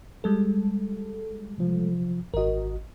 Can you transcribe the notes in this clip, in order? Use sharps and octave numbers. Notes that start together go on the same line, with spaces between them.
G3 G#3 A4
C3 F3
G#1 F#4 A#4 D#5